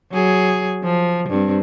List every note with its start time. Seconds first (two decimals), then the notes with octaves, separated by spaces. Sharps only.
0.12 F#3 G#4
0.84 F3
1.29 G2 C4